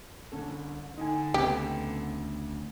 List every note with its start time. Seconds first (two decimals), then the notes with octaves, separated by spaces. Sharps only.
0.32 C2 D3 C#4 A4
0.98 D3 D#4 G5 G#5
1.34 D2 C#3 B3 C4 G4 B4